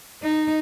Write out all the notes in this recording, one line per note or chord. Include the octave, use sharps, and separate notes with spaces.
D#4